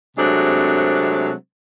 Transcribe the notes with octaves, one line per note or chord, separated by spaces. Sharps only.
C3 F#3 G#3 A3 C4 D4